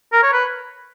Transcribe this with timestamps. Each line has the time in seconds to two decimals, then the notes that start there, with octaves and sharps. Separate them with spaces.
0.12 A#4
0.23 C#5
0.33 B4